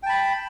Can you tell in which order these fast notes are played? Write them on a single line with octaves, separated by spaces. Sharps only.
G5 A5 B5